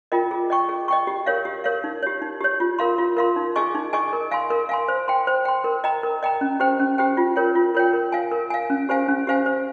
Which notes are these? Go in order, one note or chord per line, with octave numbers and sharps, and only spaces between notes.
F4 A#4 D#5 G5
G#4
D#5 G5 C#6
G#4
D#5 G5 C#6
G4
A#4 C#5 F5
G4
A#4 C#5 F5
D#4
G4 C#5
D#4
G4 C#5
F4
A#4 F5 C6
F4
A#4 F5 C6
D#4
G#4 D#5 G#5 C#6
D#4
G#4 D#5 G#5 C#6
A#4
F5 G#5 C6
A#4
F5 G#5 C6
C5
G5 C6
C5
G5 C6
A#4
D#5 G5 A#5
A#4
D#5 G5 A#5
C#4
G4 C5 G5
C#4
G4 C5 G5
F4
A#4 C#5 G5
F4
A#4 C#5 G5
A#4
F5 G#5
A#4
F5 G#5
C#4
G4 C5 F5 G#5
C#4
G4 C5 F5 G#5
C5